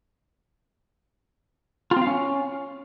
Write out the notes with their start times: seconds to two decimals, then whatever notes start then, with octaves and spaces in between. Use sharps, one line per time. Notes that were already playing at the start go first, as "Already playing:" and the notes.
1.91 F4
1.97 C4
2.02 F5
2.07 C#4